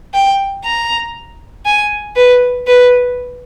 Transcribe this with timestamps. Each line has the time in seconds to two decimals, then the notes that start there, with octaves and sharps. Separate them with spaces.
0.14 G5
0.64 A#5
1.66 G#5
2.16 B4
2.67 B4